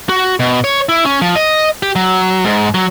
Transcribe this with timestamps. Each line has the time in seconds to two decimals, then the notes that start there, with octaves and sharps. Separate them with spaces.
0.09 F#4
0.40 B2
0.64 C#5
0.89 E4
1.05 C#4
1.22 F3
1.35 D#5
1.83 G4
1.96 F#3
2.45 G#2
2.74 F#3